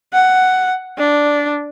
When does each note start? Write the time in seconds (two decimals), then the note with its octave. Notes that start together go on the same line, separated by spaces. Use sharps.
0.14 F#5
0.98 D4